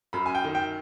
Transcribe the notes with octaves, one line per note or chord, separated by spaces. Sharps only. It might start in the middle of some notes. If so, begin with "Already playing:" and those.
F#2 B5
G#5
G5
D#3
G5